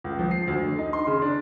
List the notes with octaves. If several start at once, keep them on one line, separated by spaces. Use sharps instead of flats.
C#2
F3
C7
D2
D3
D#4
C6
C#3
D4